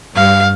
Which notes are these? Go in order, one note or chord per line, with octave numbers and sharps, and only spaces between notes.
G2 F5